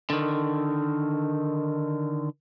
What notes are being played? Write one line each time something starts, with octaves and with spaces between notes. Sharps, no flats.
D3 D#3